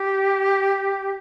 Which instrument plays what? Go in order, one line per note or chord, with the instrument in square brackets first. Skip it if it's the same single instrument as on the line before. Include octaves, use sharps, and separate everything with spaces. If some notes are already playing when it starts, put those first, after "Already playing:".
Already playing: [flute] G4